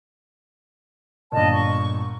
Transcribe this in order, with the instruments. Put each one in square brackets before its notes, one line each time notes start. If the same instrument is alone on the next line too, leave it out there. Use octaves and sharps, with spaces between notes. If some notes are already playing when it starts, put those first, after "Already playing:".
[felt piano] G1 A#2 [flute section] D#5 A5
[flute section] C#6